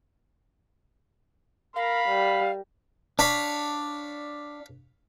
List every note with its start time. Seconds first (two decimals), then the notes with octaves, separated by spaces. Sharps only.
1.76 A#4 F5 B5
2.09 G3
3.19 D4 C#5 F5 B5